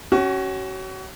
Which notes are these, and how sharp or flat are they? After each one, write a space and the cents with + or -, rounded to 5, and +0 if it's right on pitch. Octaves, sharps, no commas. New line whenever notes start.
C#4 +0 F#4 +35